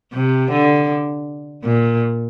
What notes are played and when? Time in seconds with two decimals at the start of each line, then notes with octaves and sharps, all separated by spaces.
0.13 C3
0.51 D3
1.64 A#2